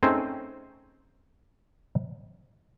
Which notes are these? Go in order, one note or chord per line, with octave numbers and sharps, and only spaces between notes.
A3 C4 C#4 D#4 G#4 C5